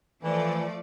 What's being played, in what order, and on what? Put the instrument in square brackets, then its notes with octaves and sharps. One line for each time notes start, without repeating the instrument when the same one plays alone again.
[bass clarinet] E3 [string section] F3 A3 D5